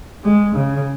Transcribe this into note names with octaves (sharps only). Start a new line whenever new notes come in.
G#3
C#3